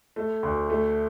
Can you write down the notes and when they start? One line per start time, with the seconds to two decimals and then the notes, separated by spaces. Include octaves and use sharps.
0.16 A3
0.43 D2
0.70 A3